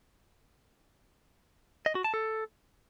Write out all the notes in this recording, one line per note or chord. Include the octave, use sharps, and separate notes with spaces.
D#5
F#4
A5
A4